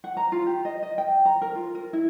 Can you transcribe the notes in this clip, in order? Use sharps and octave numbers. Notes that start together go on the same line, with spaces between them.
F#5
A#5
F4
G4
D#5
D#5
G5
A#5
A#4
F4
A#4
E4